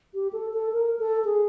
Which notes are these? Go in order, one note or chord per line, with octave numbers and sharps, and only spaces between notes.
G4
A4
A4
A#4
A4
G#4